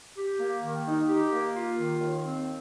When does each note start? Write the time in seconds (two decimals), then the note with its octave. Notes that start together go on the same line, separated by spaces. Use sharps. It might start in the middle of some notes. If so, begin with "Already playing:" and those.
0.17 G4
0.39 A#3
0.62 D#3
0.86 D#4
1.08 G4
1.32 A#3
1.54 F4
1.78 D#3
2.00 D#2
2.24 C4